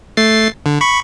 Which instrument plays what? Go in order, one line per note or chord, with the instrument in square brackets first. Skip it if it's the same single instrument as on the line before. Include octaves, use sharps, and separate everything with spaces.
[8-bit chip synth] A3 A6 C7
D3
B5 C#6